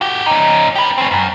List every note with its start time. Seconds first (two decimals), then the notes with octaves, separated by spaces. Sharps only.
0.01 F#4 G4
0.26 C#4 D#4
0.75 G4 B4
0.98 C4 C#4
1.11 F#2